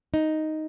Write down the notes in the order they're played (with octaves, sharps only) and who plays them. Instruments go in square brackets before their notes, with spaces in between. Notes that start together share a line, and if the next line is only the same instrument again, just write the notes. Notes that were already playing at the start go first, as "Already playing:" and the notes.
[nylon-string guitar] D#4